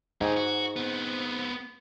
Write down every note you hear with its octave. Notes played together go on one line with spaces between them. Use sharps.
G#2 D#4 G4 G#5
F#4
B3 C4